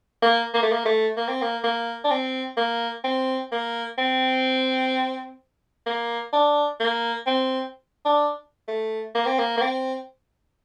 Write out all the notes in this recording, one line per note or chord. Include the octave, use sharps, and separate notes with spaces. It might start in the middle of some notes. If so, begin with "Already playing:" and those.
A#3
A#3
A3
A#3
A3
A#3
C4
A#3
A#3
D4
C4
A#3
C4
A#3
C4
A#3
D4
A#3
C4
D4
A3
A#3
C4
A#3
A#3
C4